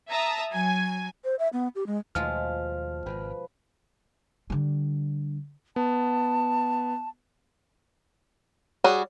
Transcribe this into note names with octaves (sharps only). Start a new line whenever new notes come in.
E5 A5 A#5 D#6
F#3 G#5
C5
E5
B3
G4
G#3
D#2 B2 F3 G#3 A3 F4 F6
G#1 B4
D3 G3
B3 A5
G3 F#4 G#4 C#5